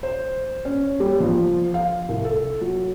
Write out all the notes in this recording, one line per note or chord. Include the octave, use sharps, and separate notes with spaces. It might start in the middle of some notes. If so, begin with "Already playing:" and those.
C5
C#4
G3
F3
F5
C2
A4
F#3